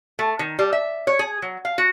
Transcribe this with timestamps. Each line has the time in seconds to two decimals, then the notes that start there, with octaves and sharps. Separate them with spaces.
0.19 A3
0.39 D#3
0.59 G3
0.73 E5
1.07 C#5
1.19 G#4
1.42 F#3
1.65 F5
1.78 F#4